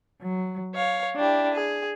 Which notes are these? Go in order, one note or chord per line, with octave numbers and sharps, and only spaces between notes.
F#3
C#5 F5
D4 E4 G4
G#4